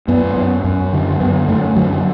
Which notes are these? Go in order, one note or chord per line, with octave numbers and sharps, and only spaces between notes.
F#2 B3
F#2
F#2
D3
F#2 B3
F#2 A3
D3 F#3